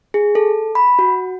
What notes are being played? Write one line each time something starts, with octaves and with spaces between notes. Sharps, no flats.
G#4
A4
B5
F#4